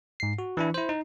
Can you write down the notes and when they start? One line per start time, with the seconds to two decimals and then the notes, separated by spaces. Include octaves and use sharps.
0.20 G#2 C7
0.39 F#4
0.57 E3 D4 E4
0.74 E4 C5
0.89 D#4